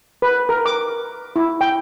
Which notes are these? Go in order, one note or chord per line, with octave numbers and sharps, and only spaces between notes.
B4
A#4
D6
E4
G5